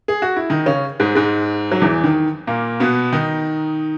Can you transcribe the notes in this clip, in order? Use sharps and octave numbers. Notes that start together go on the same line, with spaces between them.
G#4
F#4
E4
D#3 D#4
C#3 C#4
G#2 G#3
G#2 G#3
F#3
E2 E3
D#3
A#2 A#3
B2 B3
D#3 D#4